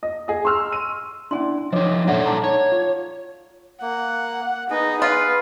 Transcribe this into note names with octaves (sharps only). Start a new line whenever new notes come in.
D#5
G#4 D#5
C6 C#6 E6 F6
D#7
C#4 D4 E4 D5 G#5 C6
F3 D#4 C#5 D#5 D6
A#2 D4 D#4 A4 C#5 D5 E5 F#5
G#4 A5 A#5 D6
C#5
F4
A#3 F#5
B3 D#4 G#4
F4 B4